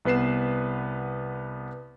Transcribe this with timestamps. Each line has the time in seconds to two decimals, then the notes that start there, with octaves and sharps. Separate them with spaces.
0.05 C2 B3 B4 C7 E7